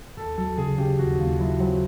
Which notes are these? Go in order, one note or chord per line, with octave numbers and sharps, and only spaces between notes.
D#2 A4
F#3 A4
C#3 G#4
C#3 G4
D#2 F#4
D#2 F4
F#3 E4
F#3 C4